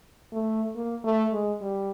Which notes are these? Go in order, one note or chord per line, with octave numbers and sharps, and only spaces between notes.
A3
A#3
A3
G#3
G3